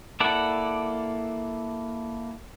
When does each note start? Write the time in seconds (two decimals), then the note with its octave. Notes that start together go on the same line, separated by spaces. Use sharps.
0.20 A#3 E4 A4 D5 F#5